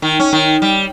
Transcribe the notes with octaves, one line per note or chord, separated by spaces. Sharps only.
D#3
C#4
D#3
G3